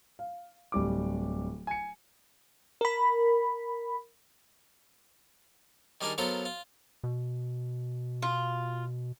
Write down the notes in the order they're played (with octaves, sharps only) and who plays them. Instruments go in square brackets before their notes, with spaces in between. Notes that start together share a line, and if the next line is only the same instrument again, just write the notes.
[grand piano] F5
D1 G3 D6
G#5 C#7
[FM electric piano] A#4 B5
[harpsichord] D#3 G3 D4 D#4 G#4 A#4
F#3 B3 F4 A4 A#4 C5
F4
[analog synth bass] B2
[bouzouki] F4